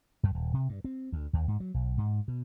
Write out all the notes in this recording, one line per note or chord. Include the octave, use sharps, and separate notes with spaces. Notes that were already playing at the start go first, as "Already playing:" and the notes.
F#2
D#1
C3
G2
C4
D2
D#2
G#2
F#3
B1
G#2
B2